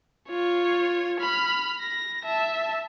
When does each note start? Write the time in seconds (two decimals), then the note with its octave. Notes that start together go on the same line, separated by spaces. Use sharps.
0.29 F4 C#5
1.20 B5 F6
1.81 A#6
2.25 E5 A5